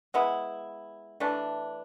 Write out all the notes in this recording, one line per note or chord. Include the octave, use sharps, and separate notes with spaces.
G#3 B3 E4
E3 A3 D4